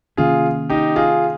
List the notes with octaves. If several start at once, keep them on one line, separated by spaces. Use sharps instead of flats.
C3 D#3 A#3 C#4 F4 G#4
D#4 G4
F4 G#4